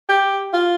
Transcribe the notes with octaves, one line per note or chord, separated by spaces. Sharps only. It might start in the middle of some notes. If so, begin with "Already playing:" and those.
G4
F4